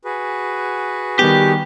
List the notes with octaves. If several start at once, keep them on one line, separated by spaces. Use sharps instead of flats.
F#4 G#4 B4
D#3 G3 B3 G4